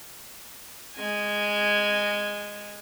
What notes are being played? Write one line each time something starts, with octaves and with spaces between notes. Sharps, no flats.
G#3 G#5